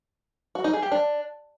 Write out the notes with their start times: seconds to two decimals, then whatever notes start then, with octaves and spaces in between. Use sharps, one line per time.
0.55 F#4
0.64 D#4
0.73 G#4
0.82 G4
0.92 D4